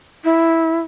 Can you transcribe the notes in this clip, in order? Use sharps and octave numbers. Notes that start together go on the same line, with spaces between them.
E4